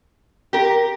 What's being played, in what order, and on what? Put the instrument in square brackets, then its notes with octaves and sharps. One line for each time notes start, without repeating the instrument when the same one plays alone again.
[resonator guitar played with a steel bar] G4 A#4